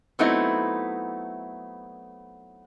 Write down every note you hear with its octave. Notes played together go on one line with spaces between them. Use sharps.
F#3 A3 B3 C4 D#4 E4